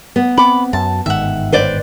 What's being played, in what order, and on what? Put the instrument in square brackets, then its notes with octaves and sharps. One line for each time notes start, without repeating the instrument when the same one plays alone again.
[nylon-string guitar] B3
[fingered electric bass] C4 [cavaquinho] B5 D6
[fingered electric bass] F#2 [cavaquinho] A5
[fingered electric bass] G1 G#2 D#3 [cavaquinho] E5 F#5
[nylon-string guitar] B4 C5 D5